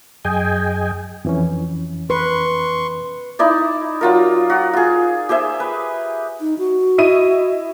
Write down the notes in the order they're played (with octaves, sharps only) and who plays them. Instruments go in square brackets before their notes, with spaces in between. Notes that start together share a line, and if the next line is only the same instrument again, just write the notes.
[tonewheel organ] F#2 G#4 D#5 G5 G#5
[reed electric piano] F2 E3 C#4
[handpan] B4 [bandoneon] C6 C#6
[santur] D#4 E4 D5
F#3 F4 A#4
F#4
F4 G#4
G4 G#4 C5 E5
B4
[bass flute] D#4
F#4
[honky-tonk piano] E4 D#5 D#7